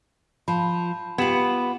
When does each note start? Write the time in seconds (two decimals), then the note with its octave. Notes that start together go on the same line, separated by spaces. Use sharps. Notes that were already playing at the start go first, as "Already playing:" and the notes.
0.48 F3 F5 A5 B5
1.18 B3 F4 G4 G#6 E7 F#7